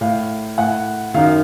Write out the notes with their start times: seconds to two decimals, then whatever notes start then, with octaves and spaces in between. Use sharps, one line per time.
0.01 A2 F5
0.58 A2 F#5
1.14 F#2 D#3 F5